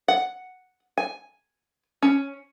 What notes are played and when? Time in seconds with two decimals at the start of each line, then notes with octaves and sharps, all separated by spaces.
0.08 F#5
0.97 G#5
2.02 C#4